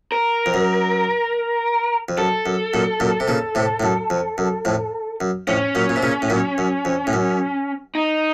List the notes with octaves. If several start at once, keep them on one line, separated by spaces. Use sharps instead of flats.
A#4
F2
F#2
F2
F#2 A4
F#2
F#2 A#2
F#2 A#2
C3
A#2 C#3
A2 C3
A2
F#2
F2
F#2
F2 A2
F#2
F2 A2 C#4
F#2 A#2
A#2
C3
A#2 C#3
A2
F#2 A#2
F#2
F2
A2
F#2
D#4